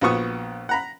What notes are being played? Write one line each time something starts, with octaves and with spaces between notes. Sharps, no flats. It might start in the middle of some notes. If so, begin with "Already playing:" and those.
A#1 F3 B3 F#4 C#6 D#6
F#5 A#5 B5